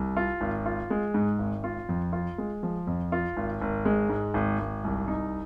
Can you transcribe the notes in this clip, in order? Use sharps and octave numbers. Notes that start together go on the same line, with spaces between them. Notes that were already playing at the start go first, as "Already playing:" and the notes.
Already playing: C2
F4
G#1
F4
G#3
G#2
G#1
F4
F2
F4
G#3
F3
F2
F4
G#1
G#1
G#3
G#2
G#1
G#1
C2
D#4